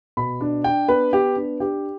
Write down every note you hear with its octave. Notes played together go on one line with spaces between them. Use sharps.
B2 B5
D4
D4 G5
B3 B4
B3 G4
D4
D4 G4